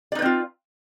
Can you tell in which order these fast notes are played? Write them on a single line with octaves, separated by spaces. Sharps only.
D5 D#4 B4 C4 F4